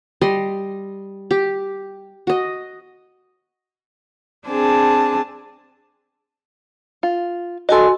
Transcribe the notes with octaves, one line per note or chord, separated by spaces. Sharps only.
G3 D#5 C6
G4
F#4 D#5
C4 D4 G#4 A5
F4
F#4 A4 D#5 G#5 C6